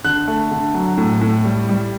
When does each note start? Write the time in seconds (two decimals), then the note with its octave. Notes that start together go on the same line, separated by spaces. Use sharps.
0.04 D3 F#6
0.28 A3
0.51 D3
0.74 F#3
0.98 A2
1.21 A2
1.45 G3
1.69 G3